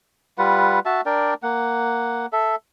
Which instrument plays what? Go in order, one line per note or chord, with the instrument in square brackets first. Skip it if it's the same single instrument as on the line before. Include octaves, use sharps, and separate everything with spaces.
[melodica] G3 F4 B4 F#5
F#4 E5 A5
D4 A#4 D5 G5
A#3 F#5
A4 E5